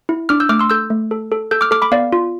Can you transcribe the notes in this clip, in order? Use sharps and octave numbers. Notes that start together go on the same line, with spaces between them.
E4
D4 D6 F6
E6 G6
A3 D6 F6
C6 E6
A4 E6 G6
A3
A4
A4
A4 E6 G6
D6 F6
A4 D6 F6
B5 D6
B3 D5 F5
F4